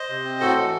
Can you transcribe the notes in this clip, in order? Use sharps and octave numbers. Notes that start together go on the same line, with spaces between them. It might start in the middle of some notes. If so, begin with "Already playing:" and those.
Already playing: C5 D#5
C3
C4
A2 F#4 A4
E3